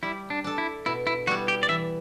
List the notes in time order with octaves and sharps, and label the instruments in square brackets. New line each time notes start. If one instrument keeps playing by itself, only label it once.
[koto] G3 [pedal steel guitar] E4
[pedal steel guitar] D4
[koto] D4 A4
[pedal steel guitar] E4
[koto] B2 [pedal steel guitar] E4
[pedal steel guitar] E4
[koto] G3 B3 E4 [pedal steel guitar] F#4
[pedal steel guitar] G4
D5
[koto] E3 [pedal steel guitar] E5